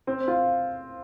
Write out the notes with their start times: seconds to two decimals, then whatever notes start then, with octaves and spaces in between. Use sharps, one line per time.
0.07 C4
0.28 F4